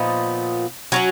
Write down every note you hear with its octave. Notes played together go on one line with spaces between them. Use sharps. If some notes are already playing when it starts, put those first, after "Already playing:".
Already playing: A#2 F3 B3 D#4
F#3 C#4 F#4